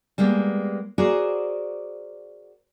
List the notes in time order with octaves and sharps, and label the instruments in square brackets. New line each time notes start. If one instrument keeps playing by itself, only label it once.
[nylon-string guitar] G3 G#3 A#3 B3
F#4 G#4 A#4 C5 D5